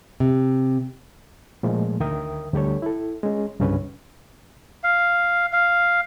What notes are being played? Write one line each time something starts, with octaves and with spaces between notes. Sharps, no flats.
C3
A#2 F3 G#3 A3
D2 D#3 A#4 E5 G5 D#6
D2 G3 G4 A4 C#5
E4 A4
G#3 C#4
C2 G2 C#3 C#4 B4
F5
F5